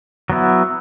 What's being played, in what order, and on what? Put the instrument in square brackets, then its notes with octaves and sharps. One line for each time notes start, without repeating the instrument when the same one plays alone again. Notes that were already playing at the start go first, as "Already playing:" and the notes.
[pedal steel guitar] F#3 B3 E4